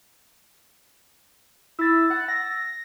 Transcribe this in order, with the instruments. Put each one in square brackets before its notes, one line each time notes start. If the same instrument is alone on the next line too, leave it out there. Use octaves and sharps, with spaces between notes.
[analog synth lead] E4 [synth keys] E6 A6
[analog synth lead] F#5
A#6